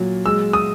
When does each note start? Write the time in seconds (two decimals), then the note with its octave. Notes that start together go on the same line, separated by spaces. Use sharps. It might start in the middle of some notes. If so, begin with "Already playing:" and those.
Already playing: A#2 F#3
0.25 G#3 E6
0.53 D#6